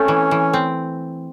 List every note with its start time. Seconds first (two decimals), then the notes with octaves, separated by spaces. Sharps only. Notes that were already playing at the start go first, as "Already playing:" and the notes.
Already playing: A3 C4 C#4
0.08 E3
0.31 E3
0.53 C4